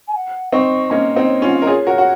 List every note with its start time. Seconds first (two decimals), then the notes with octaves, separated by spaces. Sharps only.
0.08 G#5
0.15 F#5
0.52 C4 D#4 C#6
0.90 A#3 C#4 D#5
1.16 C4 D#4
1.29 C#5
1.42 C#4 F4
1.46 F#5
1.53 F5
1.60 A#4 D#5
1.67 F4 G#4 C#5
1.87 F#4 A#4
1.98 F#4